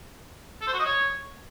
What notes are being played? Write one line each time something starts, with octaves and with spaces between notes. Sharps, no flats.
A4
C5
F#4
D#5
C#5